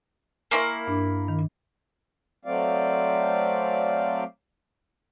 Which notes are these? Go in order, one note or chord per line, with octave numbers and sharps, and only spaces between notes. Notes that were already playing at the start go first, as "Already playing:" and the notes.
A#3 E4 G#5 C6 C#6
G2 D4
D#3
F#3 A3 C4 D5 F5